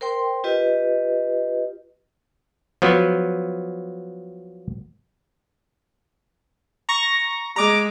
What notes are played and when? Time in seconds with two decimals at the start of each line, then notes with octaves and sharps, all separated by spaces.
0.01 A#4 C5 G5 C6
0.44 F4 G4 B4 D#5
2.82 F3 F#3 B3
6.89 A#5 C#6 A#6
7.56 G#3 A#5 D6